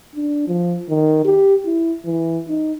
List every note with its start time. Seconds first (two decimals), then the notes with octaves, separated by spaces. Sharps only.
0.15 D4
0.47 F3
0.89 D#3
1.24 G4
1.65 E4
2.05 E3
2.49 D#4